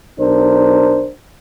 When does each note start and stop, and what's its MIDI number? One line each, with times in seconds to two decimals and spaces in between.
0.20 1.09 35
0.20 1.09 62
0.20 1.09 70
0.20 1.09 72